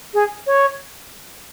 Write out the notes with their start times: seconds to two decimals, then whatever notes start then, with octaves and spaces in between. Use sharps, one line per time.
0.14 G#4
0.47 C#5